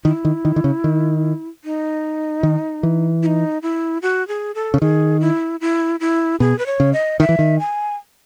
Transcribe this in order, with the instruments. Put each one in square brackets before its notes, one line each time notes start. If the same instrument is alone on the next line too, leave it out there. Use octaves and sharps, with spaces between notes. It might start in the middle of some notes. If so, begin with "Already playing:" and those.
[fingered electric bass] D#3 [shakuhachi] E4
[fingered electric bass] D#3
D#3
D#3
C#3
D#3
[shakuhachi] D#4
[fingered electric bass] D#3
E3
[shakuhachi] E4
D#4
E4
F#4
G#4
A4
[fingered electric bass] C#3
[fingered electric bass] D#3 [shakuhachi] G#4
[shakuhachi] E4
E4
E4
[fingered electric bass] B2 [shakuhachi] G#4
[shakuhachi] B4
C#5
[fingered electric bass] C#3
[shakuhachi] D#5
[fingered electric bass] D#3 [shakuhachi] E5
[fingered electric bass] E3
D#3
[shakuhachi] G#5